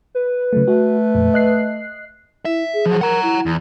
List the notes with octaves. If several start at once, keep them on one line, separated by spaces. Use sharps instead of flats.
B4
C#3 F#3 A3
A3 F#4
F2 A#2
D#5 F#6 C7
E4 E5
G#4
F3 F#3
A#4 F#5 A#5
E4
E2